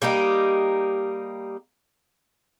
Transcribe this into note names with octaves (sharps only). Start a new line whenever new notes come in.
G3 A#3 D#4 G4